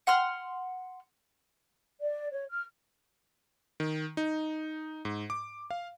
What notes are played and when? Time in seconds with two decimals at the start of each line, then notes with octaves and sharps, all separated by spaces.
0.07 F#5 C6 F6
2.02 D5
2.31 C#5
2.49 F6
3.80 D#3
4.17 D#4
5.05 G#2
5.30 D6
5.71 F5